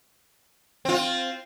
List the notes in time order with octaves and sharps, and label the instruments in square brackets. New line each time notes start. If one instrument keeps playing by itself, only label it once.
[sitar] C4 F4